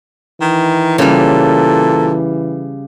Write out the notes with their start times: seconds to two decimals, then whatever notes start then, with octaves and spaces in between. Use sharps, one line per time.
0.41 D#3 E3
0.98 A#2 C#3 G3 A4